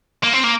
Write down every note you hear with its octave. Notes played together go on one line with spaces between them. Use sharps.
A#3
C4
A#3